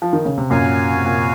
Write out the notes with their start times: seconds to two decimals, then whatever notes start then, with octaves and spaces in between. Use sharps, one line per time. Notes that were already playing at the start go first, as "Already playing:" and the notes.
0.02 F3
0.13 D#3
0.25 C#3
0.38 C3
0.50 F#2 A#2 F#4 C#5 F5 G#5
0.95 C3
1.05 A#2